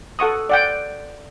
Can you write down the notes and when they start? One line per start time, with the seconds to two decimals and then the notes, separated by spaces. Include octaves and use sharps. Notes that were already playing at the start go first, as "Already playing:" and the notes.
0.19 A4 F#5 C#6 D#6
0.49 D5 F#5 G5